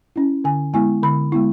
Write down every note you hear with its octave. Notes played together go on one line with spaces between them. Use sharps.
C#4 E4
D3 G#5
G#3 B3 E4 G#5
D3 B5
G#3 B3 E4